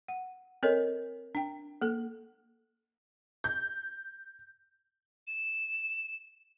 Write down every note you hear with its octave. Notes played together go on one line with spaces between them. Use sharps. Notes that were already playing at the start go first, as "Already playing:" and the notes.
F#5
C4 A4 A#4 C#5 D#5
D4 G5
A#3 A4
G6
E7